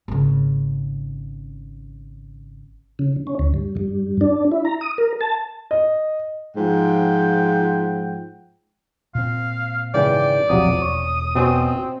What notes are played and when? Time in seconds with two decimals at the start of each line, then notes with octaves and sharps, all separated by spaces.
0.08 G#1 C#3
2.99 C#3
3.27 C#4
3.39 D2
3.54 G2
3.77 G2
4.21 D4
4.51 E4
4.65 A#5
4.81 D#6
4.98 A#4
5.21 A5
5.71 D#5
6.56 G#2 F3 F#5 G5
9.15 A#2 C4 F5
9.94 G#1 C#3 E3 D5 G5
10.49 E1 A#1 C3 F3 F#3 D#6
10.82 E1 C#5
11.35 B2 C4 C#4 C5